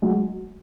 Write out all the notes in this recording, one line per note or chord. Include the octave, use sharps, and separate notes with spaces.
F#3 G#3